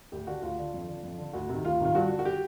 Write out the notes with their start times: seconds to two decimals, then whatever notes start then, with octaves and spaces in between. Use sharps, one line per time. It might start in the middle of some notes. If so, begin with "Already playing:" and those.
0.12 D2 G4
0.27 D3 F#4
0.42 D2 F4
0.58 D3
0.74 F2
0.88 D3
1.03 F2
1.18 D3
1.33 D2 F#4
1.49 C3 D#3
1.64 D2 F4
1.80 C3 D#3 F4
1.95 G2 F#4
2.09 D3
2.19 F#4
2.25 G4